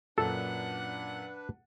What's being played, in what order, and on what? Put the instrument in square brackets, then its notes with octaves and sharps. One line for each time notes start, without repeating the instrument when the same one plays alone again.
[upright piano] F#2 A#2 [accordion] D4 B4 [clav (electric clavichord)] A4 [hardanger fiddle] F#5